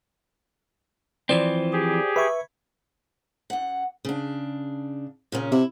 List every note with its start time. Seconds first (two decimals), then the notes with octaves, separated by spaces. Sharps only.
1.29 E3 F3 C4 C5 D5
1.73 G4 G#4
2.16 B4 E5 B5 C#6 G#6
3.50 F#2 F#5
4.05 C#3 D4
5.32 A#2 C#3 C#4
5.52 C3 E4